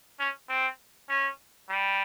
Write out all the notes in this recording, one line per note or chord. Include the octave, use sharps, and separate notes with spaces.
C#4
C4
C#4
G3